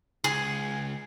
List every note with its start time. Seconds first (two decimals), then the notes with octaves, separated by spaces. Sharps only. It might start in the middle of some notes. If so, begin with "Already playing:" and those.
0.24 C#2 G#4